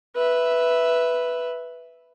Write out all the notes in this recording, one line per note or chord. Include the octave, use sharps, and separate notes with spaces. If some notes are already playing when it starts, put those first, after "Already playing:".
B4 E5